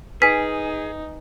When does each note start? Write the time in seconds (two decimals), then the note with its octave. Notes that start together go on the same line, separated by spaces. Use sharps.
0.22 D#4 G#4 B4 G#5 B6